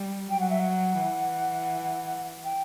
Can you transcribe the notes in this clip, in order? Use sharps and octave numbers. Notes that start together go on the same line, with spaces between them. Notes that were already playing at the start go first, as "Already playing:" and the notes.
Already playing: G3
F#3 G5
F#5
E5
F#5
E3
G5